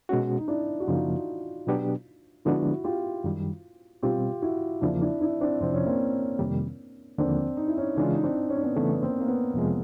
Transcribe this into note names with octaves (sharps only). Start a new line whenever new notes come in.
B2 G#3 C#4 F#4
D#4
D4 E4
F#4
F#2 C#3 F3 A#3 D#4 F4
B2 F#3 B3 D4 G4
D3 F3 G#3 B3 D4 E4 F#4
F4 G4
F#2 D#3 G3
B2 G3 C4 F4 G4
E4 F#4
E2 C#3 F3 A#3 D4 E4
D4 E4
D4 E4
C4 D4
F2 C3 F3 C4
C#4
A#3 C4
F2 C3 D#3 G3 A#3
D#2 D3 F3 A#3 C4 D4
D#4
E4
C#4 D#4
C#3 E3 G#3 C#4 D4 E4 F4
D#4
C4 D4
C#4
D4
B3 C#4
C#3 E3 A3 B3
B3
A#3 C4
A#3
B3
F2 C3 F3 G#3